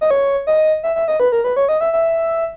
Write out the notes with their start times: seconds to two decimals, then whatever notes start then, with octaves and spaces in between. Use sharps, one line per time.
0.01 D#5
0.11 C#5
0.47 D#5
0.84 E5
0.96 E5
1.08 D#5
1.20 B4
1.32 A#4
1.44 B4
1.56 C#5
1.69 D#5
1.81 E5
1.93 E5